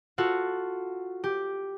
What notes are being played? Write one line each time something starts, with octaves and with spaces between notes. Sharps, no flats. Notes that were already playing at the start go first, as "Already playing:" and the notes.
F4 F#4 A4
G4